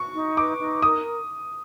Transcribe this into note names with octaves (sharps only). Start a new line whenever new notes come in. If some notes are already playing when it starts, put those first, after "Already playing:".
Already playing: F#4 C#6
D#4
B4 D6
D#4
A#4 D#6